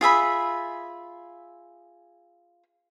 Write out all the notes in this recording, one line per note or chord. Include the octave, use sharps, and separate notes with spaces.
F4 G#4 E5 B5